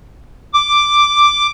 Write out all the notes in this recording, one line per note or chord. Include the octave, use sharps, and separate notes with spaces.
D6